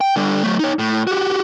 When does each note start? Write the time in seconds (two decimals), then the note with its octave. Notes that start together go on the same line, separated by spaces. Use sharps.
0.01 G5
0.16 D3 G3
0.44 F#3 A3
0.59 D#4 C#5
0.79 A2
1.07 F#4 G4